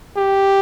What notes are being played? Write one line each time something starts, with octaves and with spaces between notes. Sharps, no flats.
G4